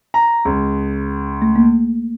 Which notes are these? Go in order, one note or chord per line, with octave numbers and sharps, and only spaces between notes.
A#5
C#2
A3
A#3